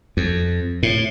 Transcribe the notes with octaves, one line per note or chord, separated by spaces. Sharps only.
F2
A2